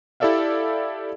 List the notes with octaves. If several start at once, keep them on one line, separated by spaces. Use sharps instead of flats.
E4 G4 A4 D5 E5 F5